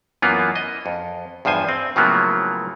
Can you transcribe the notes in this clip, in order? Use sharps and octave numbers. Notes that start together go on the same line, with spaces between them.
F#2 E3 A#3 B3 F4
D#5
F2
E2 G2 F3 C5 G#5
C4
A2 C#3 F3 F#3 A#3 B3